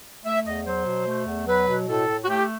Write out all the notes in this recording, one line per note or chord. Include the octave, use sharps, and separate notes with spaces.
A3 E5
E2 D#5
F#3 C5
B2
A3
E2
F#3 B4
B2
A2 A4
A2
F#4
A3 G4